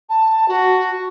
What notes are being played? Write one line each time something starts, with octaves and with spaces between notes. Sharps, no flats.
A5
F#4